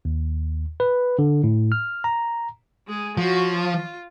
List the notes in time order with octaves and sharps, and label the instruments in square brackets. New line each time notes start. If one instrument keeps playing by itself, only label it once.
[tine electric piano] D#2
B4
D3
A2
F6
A#5
[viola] G#3 G#4
[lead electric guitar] F3 [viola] F#4 C#5
[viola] F4